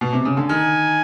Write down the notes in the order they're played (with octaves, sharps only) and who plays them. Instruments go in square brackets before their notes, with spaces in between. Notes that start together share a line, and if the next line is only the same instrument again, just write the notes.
[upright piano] B2
C3
C#3
D3
[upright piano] D#3 [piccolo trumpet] G#5